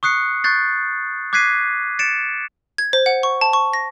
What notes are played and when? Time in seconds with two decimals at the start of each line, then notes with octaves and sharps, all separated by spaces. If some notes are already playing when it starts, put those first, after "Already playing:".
0.03 C#6 D#6 F#6 C7 C#7
0.44 C#6 F#6 G6 A6 C7
1.33 D6 F#6 G#6 B6 C7 D#7
1.99 A6 C#7 D7 E7
2.78 G#6
2.93 C5
3.06 F#5
3.23 C#6
3.41 A5
3.53 C#6
3.73 A#6